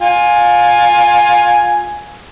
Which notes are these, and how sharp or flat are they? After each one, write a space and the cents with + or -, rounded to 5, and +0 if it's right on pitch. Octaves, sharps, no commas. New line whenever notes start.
F4 +20 G#5 +0